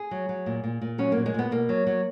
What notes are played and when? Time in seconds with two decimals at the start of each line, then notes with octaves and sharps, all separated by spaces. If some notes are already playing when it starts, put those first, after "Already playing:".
Already playing: G#4
0.11 F#3
0.29 F#3
0.46 A#2
0.64 A#2
0.81 A#2
0.98 F#3 C#4
1.12 A#2 A#3
1.26 G#3
1.34 A#2 B3
1.51 B2 A#3
1.69 F#3
1.87 F#3